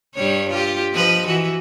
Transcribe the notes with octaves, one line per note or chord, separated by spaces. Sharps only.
G2 G3 C#5
F4 G4
F3 B4 D#5
E3 F#4